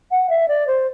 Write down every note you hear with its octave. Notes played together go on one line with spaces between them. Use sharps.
F#5
E5
D5
C5